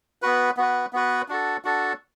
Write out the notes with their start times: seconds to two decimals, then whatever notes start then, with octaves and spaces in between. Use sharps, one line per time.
0.22 B3 F#4 B4
0.57 B3 F#4 B4
0.93 B3 F#4 B4
1.28 D4 F#4 A4
1.65 D4 F#4 A4